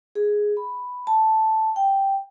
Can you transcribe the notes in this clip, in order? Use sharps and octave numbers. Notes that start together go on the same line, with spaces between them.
G#4
B5
A5
G5